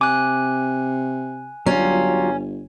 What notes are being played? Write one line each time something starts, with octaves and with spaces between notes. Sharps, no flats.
C3 G#5 D6 F#6
G1 F#3 G3 C#4 F4